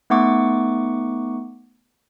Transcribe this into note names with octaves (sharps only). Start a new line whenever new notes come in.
A3 B3 D#4 F#5 C#6 D6